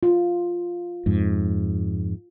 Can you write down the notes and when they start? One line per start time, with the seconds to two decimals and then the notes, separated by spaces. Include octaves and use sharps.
0.03 F4
1.06 F2 G#2